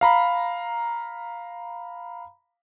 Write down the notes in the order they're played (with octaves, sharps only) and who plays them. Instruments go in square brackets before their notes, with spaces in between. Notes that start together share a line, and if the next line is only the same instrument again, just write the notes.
[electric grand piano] F5 A#5 B5